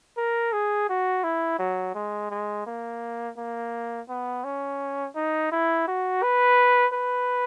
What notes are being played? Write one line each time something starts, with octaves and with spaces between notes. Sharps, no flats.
A#4
G#4
F#4
E4
F#3
G#3
G#3
A#3
A#3
B3
C#4
D#4
E4
F#4
B4
B4